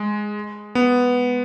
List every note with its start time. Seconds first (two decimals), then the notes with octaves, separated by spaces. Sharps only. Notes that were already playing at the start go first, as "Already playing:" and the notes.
Already playing: G#3
0.75 B3